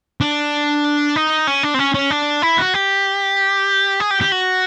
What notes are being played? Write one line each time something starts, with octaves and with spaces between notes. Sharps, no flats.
D4
D#4
C#4
D4
C4
C#4
C#4
D4
E4
F#4
G4
G#4
G4
G4
F#4